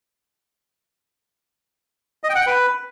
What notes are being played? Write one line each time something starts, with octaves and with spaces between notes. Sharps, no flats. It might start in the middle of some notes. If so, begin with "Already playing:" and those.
D#5
G5
F#5
G5
B4